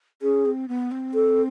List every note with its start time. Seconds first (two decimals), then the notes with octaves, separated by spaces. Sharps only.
0.22 C#4 G#4
0.46 C4
0.68 B3
0.91 C4
1.14 A4